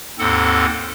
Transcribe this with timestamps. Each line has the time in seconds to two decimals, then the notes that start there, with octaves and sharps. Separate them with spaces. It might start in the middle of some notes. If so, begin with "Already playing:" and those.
0.19 D#2 G#2 C4 A4 F#5